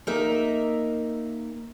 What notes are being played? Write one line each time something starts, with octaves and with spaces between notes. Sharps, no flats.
A#3 D#4 A#4 E5